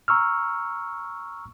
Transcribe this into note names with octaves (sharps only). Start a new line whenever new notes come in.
A#5 C#6 E6 F6